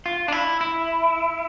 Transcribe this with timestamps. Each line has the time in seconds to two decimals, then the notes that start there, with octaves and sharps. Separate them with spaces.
0.06 F4
0.28 D4
0.32 E4
0.61 E4